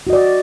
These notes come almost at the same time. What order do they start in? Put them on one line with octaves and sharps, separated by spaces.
F#4 D#5 D5